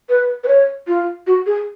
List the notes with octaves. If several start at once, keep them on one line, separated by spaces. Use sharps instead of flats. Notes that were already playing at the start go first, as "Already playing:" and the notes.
B4
B4
C#5
F4
F#4
G#4